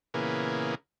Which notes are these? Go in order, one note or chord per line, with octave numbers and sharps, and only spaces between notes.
A#2 C#3 E3 A#3 B3 G#4